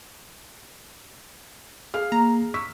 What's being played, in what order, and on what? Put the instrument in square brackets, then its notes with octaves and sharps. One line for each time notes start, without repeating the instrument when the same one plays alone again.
[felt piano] G#4 F5 F6
[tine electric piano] A#3 [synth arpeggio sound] A#5
[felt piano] C#6 E6 [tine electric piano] B6